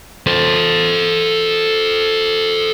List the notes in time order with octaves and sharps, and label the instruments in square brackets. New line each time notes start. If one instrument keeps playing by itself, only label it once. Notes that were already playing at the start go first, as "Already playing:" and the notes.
[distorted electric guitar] A4 C5